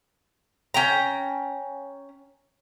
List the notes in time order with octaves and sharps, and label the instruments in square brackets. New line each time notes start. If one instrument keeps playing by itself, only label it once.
[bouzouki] C#4 G5 A#5